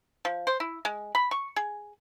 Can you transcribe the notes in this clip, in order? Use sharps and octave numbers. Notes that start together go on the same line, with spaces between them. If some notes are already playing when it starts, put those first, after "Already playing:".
F3
C5
E4
G#3
B5
C#6
G#4